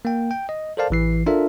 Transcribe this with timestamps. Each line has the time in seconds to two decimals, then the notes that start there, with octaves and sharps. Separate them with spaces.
0.05 A#3 G5
0.31 G5
0.49 D#5
0.77 A4 A#4 C5 D5 F5 A5
0.90 A1 E3 C7
1.26 D4 F4 A4 A#4 E5